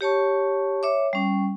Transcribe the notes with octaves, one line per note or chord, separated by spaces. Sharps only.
G4 C#5 A5 C#6
C#5 E5 D6
G3 C#4